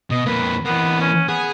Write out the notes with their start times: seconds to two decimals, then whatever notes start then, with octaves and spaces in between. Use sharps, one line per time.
0.11 B2 D#5
0.27 F2 A#3 B4
0.66 E3 A#3 B3
1.01 C#4
1.29 B3 G#4